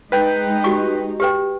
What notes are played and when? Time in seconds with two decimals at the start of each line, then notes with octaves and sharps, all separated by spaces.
0.12 G#3 D#4 B4 G5 G6
0.64 F#4 G4 C#6
1.20 G4 B4 G5